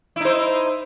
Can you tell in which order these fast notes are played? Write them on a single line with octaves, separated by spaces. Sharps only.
E4 D#4 C5